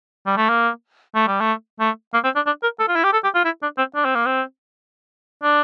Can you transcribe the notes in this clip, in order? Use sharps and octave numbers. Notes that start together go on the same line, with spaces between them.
G3
A3
A#3
A3
G3
A3
A3
A#3
C4
D4
D4
A#4
A4
F4
E4
G4
A4
G4
F4
E4
D4
C4
D4
C4
A#3
C4
D4